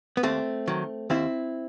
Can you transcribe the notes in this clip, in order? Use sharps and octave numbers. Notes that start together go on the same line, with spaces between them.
B3
D#2 A3 C4
D#3 F#3
D#2 C4 E4